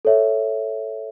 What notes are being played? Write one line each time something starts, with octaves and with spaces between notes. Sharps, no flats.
A4 C#5 E5